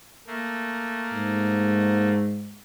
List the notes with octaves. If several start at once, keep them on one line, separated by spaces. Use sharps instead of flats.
A3 A#3
G#2